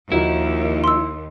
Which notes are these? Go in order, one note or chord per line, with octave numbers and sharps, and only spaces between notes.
D#2 F3 D#4 E4 F#4
C6 E6